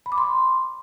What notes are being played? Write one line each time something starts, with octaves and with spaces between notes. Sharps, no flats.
B5
D6
C6